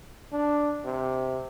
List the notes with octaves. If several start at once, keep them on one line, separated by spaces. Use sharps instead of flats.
D4
C3